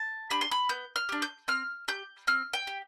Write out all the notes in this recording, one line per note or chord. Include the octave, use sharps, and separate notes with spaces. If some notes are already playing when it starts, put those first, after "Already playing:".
Already playing: A5
D4 G4 B5
C6
B5
B3 G6
F6
D4 G4
G6
C4 F6
G4 G6
C4 F6
G5
G4